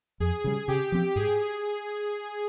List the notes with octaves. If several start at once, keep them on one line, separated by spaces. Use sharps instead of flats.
F2 G#4
C#3 G3
C#3 G4
F3 C4
G#2 G#4